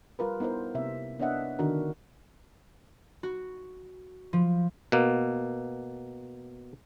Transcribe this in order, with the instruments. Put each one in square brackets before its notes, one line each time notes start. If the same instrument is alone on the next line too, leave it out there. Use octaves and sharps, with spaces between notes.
[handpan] G3 F4 A#4 B4
B3 D#4 E4 A#4 C5
C3 A#3 B3 E5
B3 D4 C#5 D#5 E5 F#5
D3 D#3 D4 F#4 A#4
[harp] F#4
F3
[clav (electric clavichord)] B2 A#3